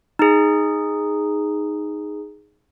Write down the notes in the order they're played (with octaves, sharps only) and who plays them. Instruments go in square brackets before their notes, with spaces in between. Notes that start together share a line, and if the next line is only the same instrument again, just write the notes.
[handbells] D#4 G#4